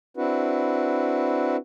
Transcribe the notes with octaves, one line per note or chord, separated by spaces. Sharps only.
C4 D4 E4 F#4 B4